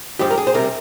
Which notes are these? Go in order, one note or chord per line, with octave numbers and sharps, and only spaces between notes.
G2 F3 G#3 G4
A#4
G#4
C5
C3 G3 A#4